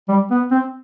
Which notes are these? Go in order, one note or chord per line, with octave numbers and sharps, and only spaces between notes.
G3
B3
C4